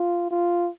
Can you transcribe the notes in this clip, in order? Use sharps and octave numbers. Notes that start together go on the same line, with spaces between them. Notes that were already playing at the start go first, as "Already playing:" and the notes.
Already playing: F4
F4